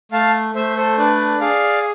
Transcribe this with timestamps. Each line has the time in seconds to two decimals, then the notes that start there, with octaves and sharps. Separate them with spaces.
0.12 A3 F5 A5
0.55 A3 C5 E5
0.77 A4 C5
0.98 D4 B4 D5
1.40 G#4 D5 F5